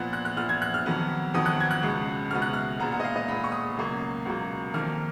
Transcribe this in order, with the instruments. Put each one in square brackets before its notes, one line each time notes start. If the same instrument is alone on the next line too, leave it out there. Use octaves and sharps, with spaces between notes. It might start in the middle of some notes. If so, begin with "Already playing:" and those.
Already playing: [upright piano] A#2 F3 B3 F#6
F#6
F#6
A#2 F3 B3 F6
G#6
F#6
F6
F2 D#3 F#3 B3
F2 D#3 F#3 B3 D#6
F#6
G#6
F#6
C#2 B2 G#3 B3
C#2 B2 G#3 B3 F6
F#6
F6
A#2 G#3 B3 A#5
F#5
D#5
F5
D#5
A#2 G#3 B3 B5
C#6
D#6
C#2 B2 F#3 A#3
C#2 B2 F#3 A#3
F2 D#3 A#3 F6